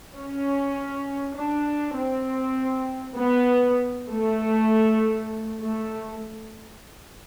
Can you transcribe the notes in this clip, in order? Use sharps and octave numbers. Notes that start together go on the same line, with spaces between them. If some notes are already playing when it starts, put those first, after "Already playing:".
C#4
D4
C4
B3
A3
A3